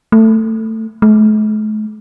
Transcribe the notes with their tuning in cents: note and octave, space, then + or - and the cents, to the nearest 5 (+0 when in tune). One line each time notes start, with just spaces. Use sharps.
A3 +15
A3 -45